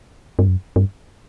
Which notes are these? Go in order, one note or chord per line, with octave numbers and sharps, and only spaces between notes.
G2
F#2
G2